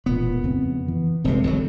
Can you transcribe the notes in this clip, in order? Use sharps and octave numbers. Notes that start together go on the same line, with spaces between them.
E1 A#2 B3
F2 C#3 C4
E3
F1 G2 C3 G#3 A3 C4
G1 A#2 F#3